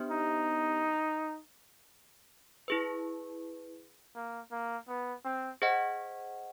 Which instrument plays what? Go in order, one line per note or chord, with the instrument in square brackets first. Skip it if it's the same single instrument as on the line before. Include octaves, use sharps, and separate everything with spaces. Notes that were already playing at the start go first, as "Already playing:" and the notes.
Already playing: [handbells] B3 D4 G4 C5
[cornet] D#4
[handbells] E4 G#4 B4
[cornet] A#3
A#3
B3
C4
[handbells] G#4 C5 D#5 F#5